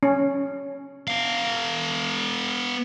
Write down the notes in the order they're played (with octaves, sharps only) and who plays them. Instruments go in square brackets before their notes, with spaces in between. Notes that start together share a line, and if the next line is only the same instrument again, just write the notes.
[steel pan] C#4
[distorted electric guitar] B3 F5